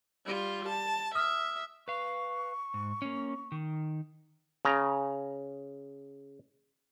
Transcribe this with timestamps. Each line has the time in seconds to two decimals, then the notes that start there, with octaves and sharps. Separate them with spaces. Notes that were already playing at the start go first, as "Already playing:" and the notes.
0.26 G3 F4
0.69 A5
1.15 E5 D#6 F6
1.88 B4 F5 C#6
2.74 G#2
3.02 A#3 C#4
3.52 D#3
4.65 C#3 A#5